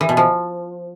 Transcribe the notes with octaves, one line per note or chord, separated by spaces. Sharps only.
E3
B2
F3